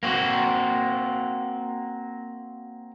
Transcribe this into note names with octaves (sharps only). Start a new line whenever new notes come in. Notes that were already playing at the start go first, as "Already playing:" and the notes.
A#3 C4 F#4